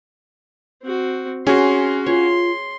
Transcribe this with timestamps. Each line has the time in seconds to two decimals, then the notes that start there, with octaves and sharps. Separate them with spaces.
0.83 C4 F#4
1.47 C#4 F#4 G#4 C6
2.06 F4 C#5 C6